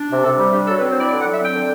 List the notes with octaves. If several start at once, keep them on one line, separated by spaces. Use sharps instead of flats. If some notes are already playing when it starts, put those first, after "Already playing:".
Already playing: D4
C3
C3 A4
G3 G4
D4 G4
F#3 A4
B4
C4
C5
E4 D5
D3 D5
F#5
F#3
E5
C4 G5
D3